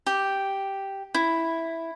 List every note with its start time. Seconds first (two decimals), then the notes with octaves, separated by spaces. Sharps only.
0.06 G4
1.14 E4